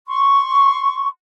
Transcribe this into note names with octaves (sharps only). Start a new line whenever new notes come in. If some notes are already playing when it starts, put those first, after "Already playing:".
C6 C#6